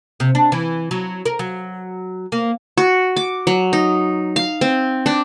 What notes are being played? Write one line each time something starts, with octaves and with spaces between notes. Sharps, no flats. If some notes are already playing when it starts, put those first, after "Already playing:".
C3
D4
E3
F#3
A#4
F#3
A#3
F#4
D6
F#3
D#4
F5
C4
D4